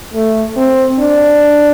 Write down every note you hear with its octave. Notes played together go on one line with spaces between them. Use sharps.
A3
C4
D4